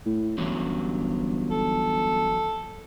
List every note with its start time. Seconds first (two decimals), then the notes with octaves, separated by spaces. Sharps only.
0.06 A2
0.38 G1 E3 F#3 C#4
1.51 A4